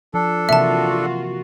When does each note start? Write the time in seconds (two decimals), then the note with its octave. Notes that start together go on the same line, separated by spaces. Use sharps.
0.14 F3 D4 A4
0.49 C3 E3 A#3 F4 F#4 E5 A5
0.91 A#4